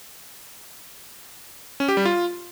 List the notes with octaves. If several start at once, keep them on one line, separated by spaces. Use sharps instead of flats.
C#4
G4
G3
F4